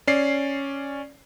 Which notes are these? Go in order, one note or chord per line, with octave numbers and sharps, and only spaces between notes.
C#4 D5 C7